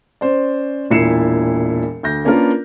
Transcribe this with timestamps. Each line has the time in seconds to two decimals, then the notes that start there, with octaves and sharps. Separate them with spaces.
0.21 C#4 C5 D5
0.90 E1 A#2 E4 C7 C#7 E7
2.03 D2 G6 A#6
2.25 A#3 C#4 D4 F4 A#4 B4